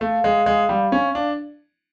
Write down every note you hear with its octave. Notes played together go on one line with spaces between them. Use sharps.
A3 F5
G#3
G#3
G3
C#4
D4